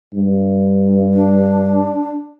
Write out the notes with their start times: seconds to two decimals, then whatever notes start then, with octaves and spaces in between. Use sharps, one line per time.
0.13 G2
1.14 D4